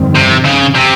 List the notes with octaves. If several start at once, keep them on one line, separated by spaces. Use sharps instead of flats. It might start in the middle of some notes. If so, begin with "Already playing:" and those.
Already playing: G1 F2 D#3 G3 C4
C3
C#3
C3